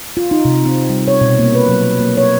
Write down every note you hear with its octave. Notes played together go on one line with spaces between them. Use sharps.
F4
D#4
C3
C4
G3
C#5
B2
A#3
B4
F#3
A#3
C#5